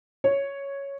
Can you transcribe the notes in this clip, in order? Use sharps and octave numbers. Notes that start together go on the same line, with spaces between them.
C#5